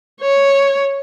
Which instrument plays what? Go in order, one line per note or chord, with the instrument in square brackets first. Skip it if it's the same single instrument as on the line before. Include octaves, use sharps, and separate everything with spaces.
[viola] C#5